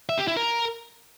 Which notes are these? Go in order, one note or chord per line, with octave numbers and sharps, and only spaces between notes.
E5
G4
E4
A#4